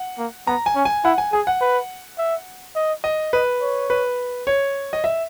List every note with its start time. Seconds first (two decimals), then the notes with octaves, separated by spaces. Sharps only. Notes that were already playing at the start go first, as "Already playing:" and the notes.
Already playing: F#5
0.18 A#3
0.47 B3 A#5
0.66 G#5
0.75 C#4
0.85 G#5
1.04 E4 F#5
1.18 G#5
1.33 G#4 G#5
1.47 F#5
1.61 B4
2.18 E5
2.76 D#5
3.04 D#5
3.33 B4 D#5
3.61 C#5
3.90 B4
4.47 C#5
4.93 D#5
5.04 E5